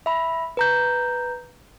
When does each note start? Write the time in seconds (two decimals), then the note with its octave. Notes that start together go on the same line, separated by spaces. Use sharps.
0.06 E5 B5
0.57 B4 A#5 G6